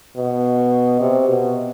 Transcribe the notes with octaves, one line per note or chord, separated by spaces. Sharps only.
B2
C3
B2